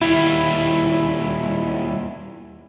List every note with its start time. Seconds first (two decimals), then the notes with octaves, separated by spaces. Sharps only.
0.01 D#2 G3 E4